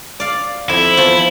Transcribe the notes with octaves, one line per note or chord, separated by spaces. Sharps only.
D5 F5
F2 E4
E2 F3 C6